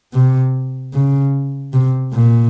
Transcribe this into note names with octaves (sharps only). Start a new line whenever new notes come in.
C3
C#3
C3
A#2